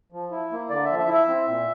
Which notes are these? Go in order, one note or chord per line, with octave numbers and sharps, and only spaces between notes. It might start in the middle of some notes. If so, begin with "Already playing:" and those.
F3
E4
A#3
D3 D5
E5
F3
E5
E4
E5
C4
A#2